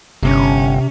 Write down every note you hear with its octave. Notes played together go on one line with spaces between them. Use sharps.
G1 C3 C#4